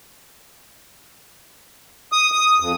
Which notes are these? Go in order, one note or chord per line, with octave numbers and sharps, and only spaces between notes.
D#6
D#6
F2